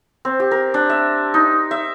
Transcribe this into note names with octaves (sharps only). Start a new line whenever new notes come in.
C4
G4
A#4
D4
E5
D#4
E5